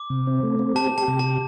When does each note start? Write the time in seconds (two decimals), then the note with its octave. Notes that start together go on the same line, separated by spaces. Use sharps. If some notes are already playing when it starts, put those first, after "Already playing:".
Already playing: D6
0.10 C3
0.27 C4
0.43 A3
0.59 C4
0.75 G4 A5
0.91 G4
0.98 A5
1.08 C3
1.19 G4 A5